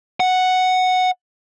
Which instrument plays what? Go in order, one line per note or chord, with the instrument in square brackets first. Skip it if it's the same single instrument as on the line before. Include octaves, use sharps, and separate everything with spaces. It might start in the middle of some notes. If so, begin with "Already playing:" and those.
[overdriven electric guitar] F#5